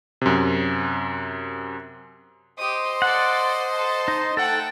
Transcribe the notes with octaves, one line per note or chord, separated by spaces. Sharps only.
F#2 C3
G4 C5 D#5 C6 D#6
A4 D5 F#5
A4 A5
D#4
A3 A4 F#5 G5 A5